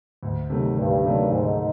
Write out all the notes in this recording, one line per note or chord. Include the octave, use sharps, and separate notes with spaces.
D2
C3 D#3 F#3 A3
D2 G2
C3 D#3 F#3 A3
D2 G#2